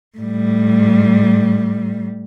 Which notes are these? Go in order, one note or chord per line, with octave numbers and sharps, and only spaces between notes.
A2 G3